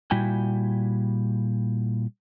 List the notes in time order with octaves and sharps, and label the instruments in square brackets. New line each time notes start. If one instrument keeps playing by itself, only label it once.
[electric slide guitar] A#2 G3 E4 F#4 G5 G#5